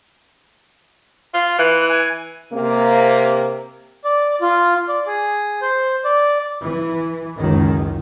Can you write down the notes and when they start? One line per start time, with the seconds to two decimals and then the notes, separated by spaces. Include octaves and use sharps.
1.34 F4
1.58 E3 F#6
1.89 G#5
2.53 C3 A#3
4.04 D5
4.41 F4
4.88 D5
5.06 G#4
5.62 C5
6.04 D5
6.65 E3
7.38 F#1 C#2 D#3